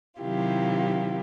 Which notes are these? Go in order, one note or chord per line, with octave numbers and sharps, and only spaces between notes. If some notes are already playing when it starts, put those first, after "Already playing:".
C3 D#3 F#3 E4 F4 G4